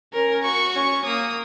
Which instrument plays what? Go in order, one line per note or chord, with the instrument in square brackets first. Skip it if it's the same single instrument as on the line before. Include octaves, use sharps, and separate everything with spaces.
[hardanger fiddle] C#4 [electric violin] A#4
[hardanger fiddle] F#4 [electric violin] C#6
[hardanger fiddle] C#4 [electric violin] C#6
[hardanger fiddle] A#3 [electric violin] D#6